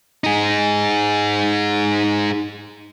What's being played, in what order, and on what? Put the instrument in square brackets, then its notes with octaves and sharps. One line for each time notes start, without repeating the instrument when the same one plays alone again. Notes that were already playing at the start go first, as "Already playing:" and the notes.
[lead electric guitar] D#4 G#4